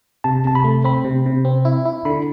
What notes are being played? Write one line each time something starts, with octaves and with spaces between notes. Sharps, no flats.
C3 A5
C3 A5
B5
A3
C4 B5
C3
C3
C4
E4
E4
D3 B5